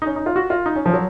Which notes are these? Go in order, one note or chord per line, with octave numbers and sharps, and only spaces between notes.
D#4
C#4
D#4
F4
F#4
F4
D#4
C#4
F3
F#3